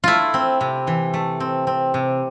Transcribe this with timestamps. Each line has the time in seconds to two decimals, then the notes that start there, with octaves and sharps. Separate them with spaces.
0.04 A3 E4 F4
0.34 C4
0.61 C3
0.87 E3
1.14 A3
1.40 C4
1.67 C4
1.94 C3